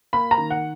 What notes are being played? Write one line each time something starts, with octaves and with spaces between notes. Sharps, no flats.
A#3 B5
A#5
D#3
F#5